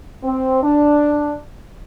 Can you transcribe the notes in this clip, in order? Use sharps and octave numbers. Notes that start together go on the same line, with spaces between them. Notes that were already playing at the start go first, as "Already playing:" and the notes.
C4
D4